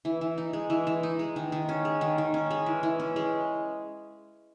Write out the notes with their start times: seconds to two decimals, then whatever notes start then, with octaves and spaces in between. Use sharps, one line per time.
0.05 E3
0.21 E3
0.38 D#4
0.53 G#3
0.70 E3
0.87 E3
1.03 D#4
1.19 G#3
1.36 D#3
1.52 D#3
1.69 C#4
1.85 G#3
2.01 D#3
2.18 D#3
2.34 C#4
2.51 G#3
2.66 E3
2.83 E3
3.00 C#4
3.16 G#3